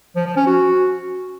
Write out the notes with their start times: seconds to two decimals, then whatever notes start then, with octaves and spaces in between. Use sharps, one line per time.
0.16 F3
0.26 F3
0.36 C#4
0.47 F#4